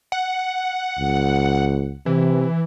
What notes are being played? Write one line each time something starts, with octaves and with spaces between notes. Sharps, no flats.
F#5
C#2
C3 E3